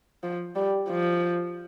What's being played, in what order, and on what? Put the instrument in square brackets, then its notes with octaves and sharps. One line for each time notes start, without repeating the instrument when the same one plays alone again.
[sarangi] F3
G3
F3